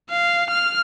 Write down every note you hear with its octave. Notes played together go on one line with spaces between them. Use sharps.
F5
F6